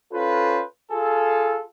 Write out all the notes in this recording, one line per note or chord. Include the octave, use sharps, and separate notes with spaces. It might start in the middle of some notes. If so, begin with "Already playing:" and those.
C#4 F4 A4 B4 C5
F4 G#4 A4